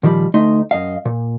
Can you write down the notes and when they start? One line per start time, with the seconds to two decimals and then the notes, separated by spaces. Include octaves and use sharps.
0.03 A#2 D#3 F3 G3 B5
0.34 D2 A3 D#4 D#5 C6
0.71 F#2 D#5 F5
1.05 A#2